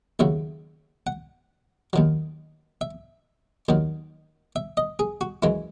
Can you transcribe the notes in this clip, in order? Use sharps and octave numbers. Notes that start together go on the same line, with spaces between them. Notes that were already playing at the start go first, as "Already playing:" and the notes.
D#2 C#3 F#3 E5
F#5
D#2 D#3 F#3
E5
D#2 D#3 F#3
E5
D#5
G#4
F#4
F#2 E3 G#3 E4